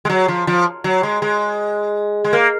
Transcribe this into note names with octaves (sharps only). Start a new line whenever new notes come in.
G#3
F#3
F3
F3
F#3
G#3
G#3
G#3
A#3